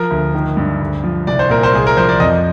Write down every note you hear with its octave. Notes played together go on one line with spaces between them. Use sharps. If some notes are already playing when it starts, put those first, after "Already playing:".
Already playing: F3 A#4
D2
D#3
G2
D2
F3
C2 D5
C5
A#2 A#4
C5
C2 G#4
A#4
F3 C5
D5
F2 D#5